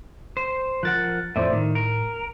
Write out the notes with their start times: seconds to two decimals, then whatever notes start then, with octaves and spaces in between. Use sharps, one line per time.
0.37 C5
0.83 F3 A#4 F#5 F#6 A6
1.36 F2 A2 C5 D5 E5
1.52 A2 D#3
1.75 A#4